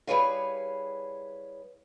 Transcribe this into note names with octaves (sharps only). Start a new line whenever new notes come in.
G3 E4 G#4 B4 C#5 F5